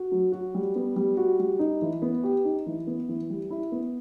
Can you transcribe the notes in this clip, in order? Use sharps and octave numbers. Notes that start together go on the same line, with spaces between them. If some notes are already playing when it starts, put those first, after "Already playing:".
Already playing: F#4
F#3
F#4
G3
B3
G3
F#4
G3
D#4
E3
B3
G4
D#4
E3
B3
E3
G3
E4
B3